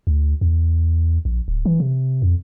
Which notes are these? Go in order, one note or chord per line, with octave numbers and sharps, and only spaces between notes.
D2
E2
A#1
D1
E3
C3
F2